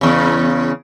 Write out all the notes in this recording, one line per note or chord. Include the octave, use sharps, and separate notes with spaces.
E2 C#3